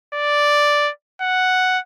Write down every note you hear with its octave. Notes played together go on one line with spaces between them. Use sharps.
D5
F#5